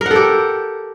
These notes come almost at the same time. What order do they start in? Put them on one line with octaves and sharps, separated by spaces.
A#4 F#5 A4 G4